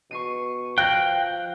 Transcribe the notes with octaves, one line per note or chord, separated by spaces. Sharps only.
B2 C#6 C7 D#7
F3 F5 G5 F#6 G6 A#6 C7